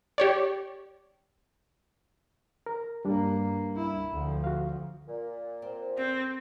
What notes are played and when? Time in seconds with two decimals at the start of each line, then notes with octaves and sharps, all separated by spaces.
0.18 G4 C#5 D5
2.66 A#4
3.05 G2 G3 A#3 D4
3.76 E4
4.12 D2 F3
4.44 F#4 F5
5.08 A#2
5.62 C4
5.97 F2 C4